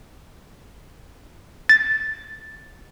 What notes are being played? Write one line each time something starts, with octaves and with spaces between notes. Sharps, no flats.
A6